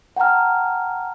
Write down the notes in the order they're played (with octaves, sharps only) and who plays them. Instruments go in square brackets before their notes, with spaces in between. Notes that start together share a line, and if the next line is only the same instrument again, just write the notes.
[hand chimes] F#5 G5 A5 A#5 F6